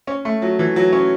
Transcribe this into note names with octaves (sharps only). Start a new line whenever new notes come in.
C#4
A3
F#3
E3
F#3
C#4